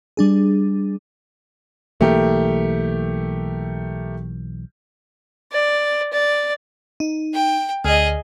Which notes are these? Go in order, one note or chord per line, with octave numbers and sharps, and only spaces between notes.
G3 D4 G#4
B1 E3 A3 A#3 G4 A#4
D5
D5
D#4
G5
D2 G#4 D#5